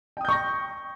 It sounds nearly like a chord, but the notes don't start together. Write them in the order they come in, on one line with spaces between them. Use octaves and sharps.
G5 D#6 G6 C#6 A#6